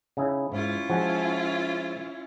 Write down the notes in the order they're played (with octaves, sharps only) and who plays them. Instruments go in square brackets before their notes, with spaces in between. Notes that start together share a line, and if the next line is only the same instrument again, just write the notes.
[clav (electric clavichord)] C#3 D#4 E4
[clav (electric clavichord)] G#2 [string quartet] C#4 E4 F4
[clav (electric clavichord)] F3 G#3 F#4